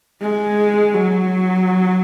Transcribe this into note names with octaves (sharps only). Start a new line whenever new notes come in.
G#3
F#3